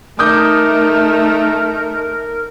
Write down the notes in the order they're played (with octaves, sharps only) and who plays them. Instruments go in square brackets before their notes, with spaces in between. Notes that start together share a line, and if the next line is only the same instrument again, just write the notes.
[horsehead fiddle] A3 D#4 [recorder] A#4 [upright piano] D6 D#6 G6